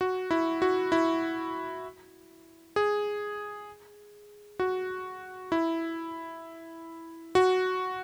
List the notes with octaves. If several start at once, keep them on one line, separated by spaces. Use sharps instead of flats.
F#4
E4
F#4
E4
G#4
F#4
E4
F#4